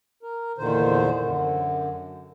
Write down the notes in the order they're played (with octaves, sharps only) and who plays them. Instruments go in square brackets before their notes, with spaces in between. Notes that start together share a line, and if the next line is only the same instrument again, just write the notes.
[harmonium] A#4
E2 A#2 D3 D#3 C5
F#2 D3